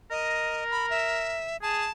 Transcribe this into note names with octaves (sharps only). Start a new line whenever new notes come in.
A#4 D#5
B5
E5
G#4 A5